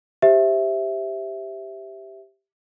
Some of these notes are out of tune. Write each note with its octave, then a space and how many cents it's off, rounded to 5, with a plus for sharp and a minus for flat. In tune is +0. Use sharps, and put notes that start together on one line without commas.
G4 +0 C5 +0 E5 +0